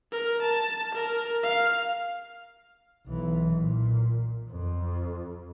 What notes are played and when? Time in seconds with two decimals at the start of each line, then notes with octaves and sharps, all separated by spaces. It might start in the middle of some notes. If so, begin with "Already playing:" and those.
0.12 A#4
0.42 A5
0.95 A#4
1.43 F5
3.07 B1 E3
3.58 A#2
4.50 F2